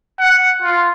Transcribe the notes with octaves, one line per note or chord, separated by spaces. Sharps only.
F#5
F4